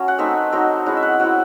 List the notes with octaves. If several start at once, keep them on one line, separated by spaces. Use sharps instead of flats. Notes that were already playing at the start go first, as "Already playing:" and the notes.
Already playing: F#3 C#4
F#5
A3 C4 D#4 E5
F#3 C4 D#4
G#3 C#4 E4 F#5
E5
F#5
F#3 C4 E4 F#5